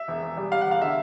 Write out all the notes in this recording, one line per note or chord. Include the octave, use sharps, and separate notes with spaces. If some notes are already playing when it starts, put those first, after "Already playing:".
Already playing: E5
E1
E1
G3
G3 F5
F#5
E1 F5
D3 E5